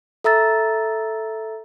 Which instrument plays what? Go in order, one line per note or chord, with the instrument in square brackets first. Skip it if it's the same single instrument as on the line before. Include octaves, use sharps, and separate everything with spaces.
[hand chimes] A4 E5 A#5 E6 A6